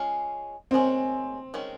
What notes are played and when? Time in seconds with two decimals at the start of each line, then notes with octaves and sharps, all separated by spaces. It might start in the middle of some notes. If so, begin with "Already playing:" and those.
Already playing: G#3 C#4 F4
0.71 D#3 G#3 C4 C#4
1.54 D#3 G#3 C#4